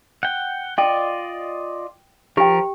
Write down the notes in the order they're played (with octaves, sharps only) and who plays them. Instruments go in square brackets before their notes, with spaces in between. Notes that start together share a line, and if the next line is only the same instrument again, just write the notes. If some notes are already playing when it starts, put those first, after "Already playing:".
[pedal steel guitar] F#5 G5
[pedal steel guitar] F4 D5 D#5 [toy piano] G5
[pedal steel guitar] F3 A#4 [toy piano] G4 G5